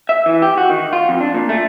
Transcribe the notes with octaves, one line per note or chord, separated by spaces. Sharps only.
E5
E3
G4
F#4
D#3
F4
F2
D4
A#2
A3